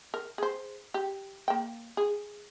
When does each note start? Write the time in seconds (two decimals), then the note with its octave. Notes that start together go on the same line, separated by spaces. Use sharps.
0.14 A#4
0.38 G#4 C5
0.94 G4
1.48 A#3 G5
1.97 G#4